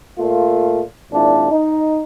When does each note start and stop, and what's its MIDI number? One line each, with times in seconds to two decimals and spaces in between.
0.19 0.82 46
0.19 0.82 57
0.19 0.82 65
1.12 1.49 32
1.12 1.49 46
1.12 1.49 62
1.12 1.49 64
1.51 2.00 63